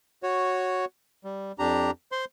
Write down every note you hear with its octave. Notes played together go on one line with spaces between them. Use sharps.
F#4 C#5
G3
F2 D4 G4 A#5
C5 C6